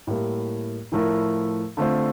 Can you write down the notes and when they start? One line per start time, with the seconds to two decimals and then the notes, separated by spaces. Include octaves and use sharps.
0.07 A2 G3 A#3 E4
0.92 A2 F3 A3 E4 A#4
1.77 D3 A3 C4 F4 C5